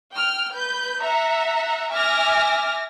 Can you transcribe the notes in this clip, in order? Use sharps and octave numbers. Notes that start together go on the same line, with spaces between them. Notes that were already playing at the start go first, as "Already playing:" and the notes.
G5 F6
B4 G6
E5 F#5 A#5
E5 G#5 D6 F6 A#6